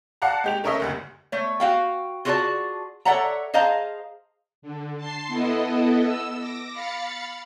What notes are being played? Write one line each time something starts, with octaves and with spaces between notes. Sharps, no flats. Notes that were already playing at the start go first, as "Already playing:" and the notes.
D5 F5 F#5 A5 A#5
G#3 G4 F7
A3 C#4 A#4 C#5 D#5 E5
F#1 D2 G2
A3 C#5
F#4 F5 G5
F4 F#4 G#4 C#5 D5 A5
A4 C#5 D5 E5 F#5 A#5
G#4 C5 D#5 F5 A5 A#5
D3
A5 C6 C7
B3 E4 A4 D#5
E6
D6 A#6
F5 B5 A6 C#7